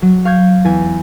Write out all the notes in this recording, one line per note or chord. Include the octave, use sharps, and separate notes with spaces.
F#3
F5 C#6 G6 G#6
E2 G#5